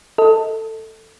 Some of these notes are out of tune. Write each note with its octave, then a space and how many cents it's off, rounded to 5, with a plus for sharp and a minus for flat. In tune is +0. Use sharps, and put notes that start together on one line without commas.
A4 +15 D#5 +30